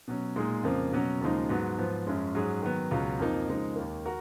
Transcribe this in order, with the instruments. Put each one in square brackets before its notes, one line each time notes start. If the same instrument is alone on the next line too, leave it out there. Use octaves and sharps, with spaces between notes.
[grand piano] B2 F#3 C#4
A#2 G#3 D#4 G#4
F2 C#3 F3 A#3
B2 F#3 C#4 F#4
D#2 C#3 F3 G#3 D#4
G#2 F#3 B3 F#4
G#2 F3 B3
F#2 F3 G#3 C#4
G#2 F#3 C#4 G#4
D#3 F#3 B3
C#2 B2 F#3 C#4 F4
F2 F3 A#3 D#4
C#3 F3 G#3 D#4 A#4
D#2 D#3 A#3
F#4 A#4